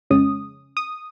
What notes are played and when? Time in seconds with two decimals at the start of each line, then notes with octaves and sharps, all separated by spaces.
0.10 F2 C#3 G#3 C#4 D#6
0.77 D#6